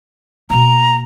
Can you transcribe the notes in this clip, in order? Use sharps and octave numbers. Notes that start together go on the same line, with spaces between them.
B2 A#3 A#5